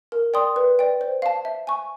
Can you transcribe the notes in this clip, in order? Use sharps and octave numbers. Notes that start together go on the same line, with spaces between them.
A#4
D5 G5 C6 D#6
B4
D5 G5
C5
F5 A5
E5
G#5 C#6